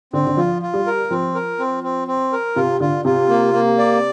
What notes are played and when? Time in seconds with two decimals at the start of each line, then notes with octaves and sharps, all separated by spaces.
0.13 D3 C4
0.27 D3
0.37 F3 F4
0.62 F4
0.73 G3
0.87 A#4
1.10 F3 C4
1.35 A#4
1.59 C4
1.83 C4
2.08 C4
2.32 A#4
2.56 C3 F4
2.80 D3 F4
3.05 C3 F4
3.29 A#3
3.53 A#3
3.78 D5